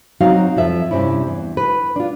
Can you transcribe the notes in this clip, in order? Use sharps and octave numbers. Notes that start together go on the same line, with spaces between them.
F#3 C4 D#4 F#4 F5
F2 F3 E5
G2 C3 C4 C#4 E4
E2
B4
D4 F4